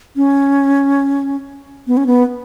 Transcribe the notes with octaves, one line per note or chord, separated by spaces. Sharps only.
C#4
B3
C#4
B3